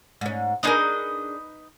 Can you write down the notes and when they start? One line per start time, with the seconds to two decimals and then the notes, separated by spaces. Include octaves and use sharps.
0.21 G#2 C#4
0.63 D4 D#4 G#4 A#4 B4 D#5